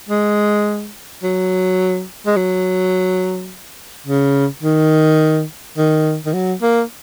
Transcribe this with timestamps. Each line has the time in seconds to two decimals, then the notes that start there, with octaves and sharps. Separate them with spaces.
0.09 G#3
1.23 F#3
2.26 G#3
2.36 F#3
4.06 C#3
4.63 D#3
5.77 D#3
6.26 D#3
6.33 F#3
6.62 A#3